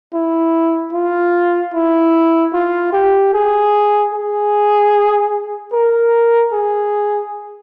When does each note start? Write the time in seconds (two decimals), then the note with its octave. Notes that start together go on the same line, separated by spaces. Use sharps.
0.14 E4
0.93 F4
1.74 E4
2.53 F4
2.93 G4
3.34 G#4
4.13 G#4
5.73 A#4
6.53 G#4